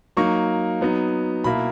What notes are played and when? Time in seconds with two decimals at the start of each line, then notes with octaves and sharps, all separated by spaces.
0.17 F#3 A#3 D#4 C#6
0.81 F#3 B3 D#4
1.44 B2 A#3 E4 B5